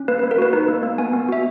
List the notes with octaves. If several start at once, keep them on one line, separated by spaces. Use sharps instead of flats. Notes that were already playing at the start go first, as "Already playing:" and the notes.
Already playing: C#4
A#3 B4
B4
A#3
A#4
F#4 B4
D#4 B4
A#3
A#3
B3 G#5
B3
F#4 E5